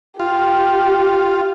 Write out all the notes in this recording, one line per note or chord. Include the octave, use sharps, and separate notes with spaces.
F4 G4